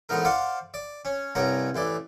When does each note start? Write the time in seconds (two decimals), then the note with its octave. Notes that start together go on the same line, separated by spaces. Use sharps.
0.09 A1 G#2 B3 D#4 A#4
0.25 C5 D5 F5 F#5
0.74 D5
1.05 C#4
1.35 C2 G2 C#4 F#5 A#5
1.75 A1 E3 D5